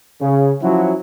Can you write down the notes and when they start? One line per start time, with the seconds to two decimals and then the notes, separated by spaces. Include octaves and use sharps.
0.21 C#3
0.61 F3 F#3 C#4 E4 F#4